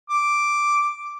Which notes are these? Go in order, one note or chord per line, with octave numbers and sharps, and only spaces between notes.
D6